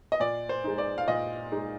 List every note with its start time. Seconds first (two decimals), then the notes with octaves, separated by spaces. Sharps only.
0.12 D#5
0.20 A#2 D5
0.49 C5
0.64 G#3 D#4
0.78 D5
0.98 F5
1.08 A#2 D#5
1.52 G#3 D#4